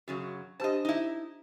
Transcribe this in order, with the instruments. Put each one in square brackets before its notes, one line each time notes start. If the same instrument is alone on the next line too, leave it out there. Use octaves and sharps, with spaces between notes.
[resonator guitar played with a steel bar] F#2 C#3 F#3 [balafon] F#4
[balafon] D4 G4 C5 [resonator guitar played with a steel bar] D#5 A5
[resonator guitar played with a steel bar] D#4 E4